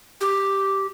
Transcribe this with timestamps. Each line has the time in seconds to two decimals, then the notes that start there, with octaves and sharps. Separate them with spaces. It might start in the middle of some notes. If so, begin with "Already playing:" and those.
0.21 G4